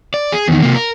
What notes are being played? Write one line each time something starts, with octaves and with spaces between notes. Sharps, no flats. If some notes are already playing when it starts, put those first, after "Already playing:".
D5
G#4
E2 D#3
C3 A#3
A#4